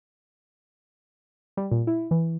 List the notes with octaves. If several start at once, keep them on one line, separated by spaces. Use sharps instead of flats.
G3
A#2
E4
E3